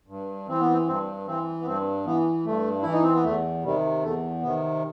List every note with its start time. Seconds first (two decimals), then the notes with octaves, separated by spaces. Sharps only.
0.08 G2
0.48 E3 C4
0.60 B3
0.73 C4
0.87 G2 C4
1.27 E3 C4
1.61 B3
1.66 G2 C4
2.06 E3 B3
2.45 G2 A3
2.82 E3 E4
2.92 D#4
3.03 C4
3.14 B3
3.24 E2 A3
3.64 C3 D#3 G3
4.03 E2 A3
4.42 C3 D#3 B3